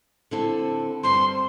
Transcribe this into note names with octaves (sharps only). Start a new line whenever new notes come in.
D3 C4 E4 A4
G2 G3 C4 C6